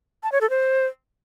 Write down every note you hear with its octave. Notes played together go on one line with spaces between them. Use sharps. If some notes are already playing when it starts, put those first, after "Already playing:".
A5
C#5
A4
C5